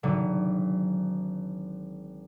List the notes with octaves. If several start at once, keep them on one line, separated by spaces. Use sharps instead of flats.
G#1 D3 F#3